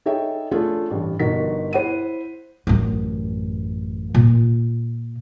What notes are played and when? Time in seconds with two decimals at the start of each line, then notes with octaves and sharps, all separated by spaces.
0.06 D#4 G#4 A4 C#5 E5 G5
0.51 A3 C#4 D4 F4 G#4
0.91 A1 G2
1.19 G1 D#4 F#4 A#4 B6
1.73 E4 C5 F#5 D#7
2.67 A1 F#2
4.14 A#2 F4